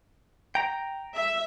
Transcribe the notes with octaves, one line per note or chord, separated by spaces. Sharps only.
G5 A#5
E5